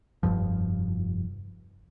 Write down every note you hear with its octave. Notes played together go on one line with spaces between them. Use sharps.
F1 C2 G2 F3